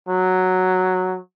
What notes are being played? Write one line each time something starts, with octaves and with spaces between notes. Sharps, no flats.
F#3